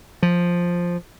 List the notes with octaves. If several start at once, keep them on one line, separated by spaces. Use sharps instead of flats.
F3